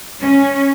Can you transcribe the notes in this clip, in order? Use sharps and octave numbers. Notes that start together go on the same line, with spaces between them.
C#4